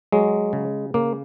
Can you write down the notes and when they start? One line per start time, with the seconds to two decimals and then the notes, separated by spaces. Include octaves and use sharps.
0.12 F#3 G#3
0.53 C#3
0.94 C#3 A#3